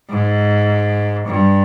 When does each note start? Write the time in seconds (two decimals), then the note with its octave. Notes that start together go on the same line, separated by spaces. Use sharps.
0.10 G#2
1.28 G2